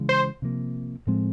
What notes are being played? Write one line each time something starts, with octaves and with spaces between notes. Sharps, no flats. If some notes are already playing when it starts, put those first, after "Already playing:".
Already playing: C#3 E3 G#3
C5
C3 F3 A#3
A2 F3 G#3 C4